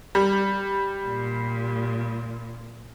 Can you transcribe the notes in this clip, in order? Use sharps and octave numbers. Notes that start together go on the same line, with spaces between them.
G3
A#2